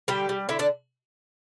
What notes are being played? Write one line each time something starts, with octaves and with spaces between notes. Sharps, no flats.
D3 G3 G4
G3
D3 E4 E5
D4 D5